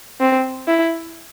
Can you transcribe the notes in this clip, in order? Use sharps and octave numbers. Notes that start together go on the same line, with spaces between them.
C4
E4